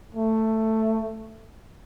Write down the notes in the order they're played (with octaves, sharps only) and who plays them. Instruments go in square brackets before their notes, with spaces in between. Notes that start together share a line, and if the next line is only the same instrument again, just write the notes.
[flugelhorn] A3